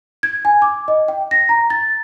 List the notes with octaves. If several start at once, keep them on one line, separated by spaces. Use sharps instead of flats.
G#6
G#5
D6
D#5
G5
A#6
A#5
A6